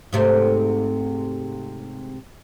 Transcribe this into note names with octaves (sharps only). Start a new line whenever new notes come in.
G#2 C3 A3